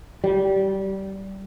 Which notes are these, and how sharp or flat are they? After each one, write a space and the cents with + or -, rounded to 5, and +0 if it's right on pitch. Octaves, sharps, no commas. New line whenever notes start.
G3 -20